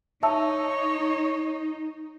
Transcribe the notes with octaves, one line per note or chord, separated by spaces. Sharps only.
D#4 C#5 E5 A5 E6